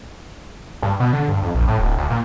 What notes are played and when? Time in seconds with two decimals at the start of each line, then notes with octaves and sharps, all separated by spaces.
0.82 G2
1.00 B2
1.13 D3
1.28 G2
1.42 F2
1.54 A#1
1.68 A2
1.79 D1
1.97 D2
2.10 A#2